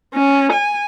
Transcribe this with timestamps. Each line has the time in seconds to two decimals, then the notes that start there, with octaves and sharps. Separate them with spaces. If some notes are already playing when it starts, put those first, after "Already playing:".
0.14 C#4
0.53 G#5